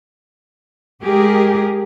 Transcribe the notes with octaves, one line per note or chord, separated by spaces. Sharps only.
G#3 G4 G#4 A#4